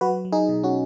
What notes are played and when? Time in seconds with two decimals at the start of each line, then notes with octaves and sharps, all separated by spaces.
0.01 F#3 F#4 B4
0.25 F#3
0.32 D#4 G#4
0.49 B2
0.64 C#4 F#4